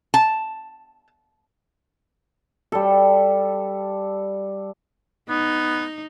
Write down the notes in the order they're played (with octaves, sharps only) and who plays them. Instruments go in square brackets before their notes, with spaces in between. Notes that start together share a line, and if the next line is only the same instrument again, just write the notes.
[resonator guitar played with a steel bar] A5
[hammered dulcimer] G3 A4
[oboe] B3 [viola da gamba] D#4